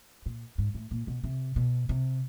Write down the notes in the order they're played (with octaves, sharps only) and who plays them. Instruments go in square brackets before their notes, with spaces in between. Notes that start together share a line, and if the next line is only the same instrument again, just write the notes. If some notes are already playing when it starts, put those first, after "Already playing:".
[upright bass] A#2
G#2
A2
A#2
B2
C3
B2
C3